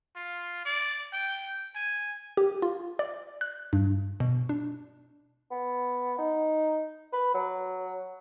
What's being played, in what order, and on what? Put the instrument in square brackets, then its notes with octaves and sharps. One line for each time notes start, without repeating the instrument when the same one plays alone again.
[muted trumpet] F4
D5
G5
G#5
[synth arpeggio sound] G4
F4
D5
F#6
G2
B2
D4
[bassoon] B3
D#4
B4
F#3